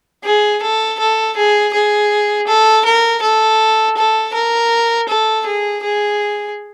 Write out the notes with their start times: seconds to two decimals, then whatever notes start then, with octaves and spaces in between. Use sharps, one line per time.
0.24 G#4
0.62 A4
0.99 A4
1.37 G#4
1.73 G#4
2.47 A4
2.85 A#4
3.22 A4
3.97 A4
4.34 A#4
5.08 A4
5.46 G#4
5.83 G#4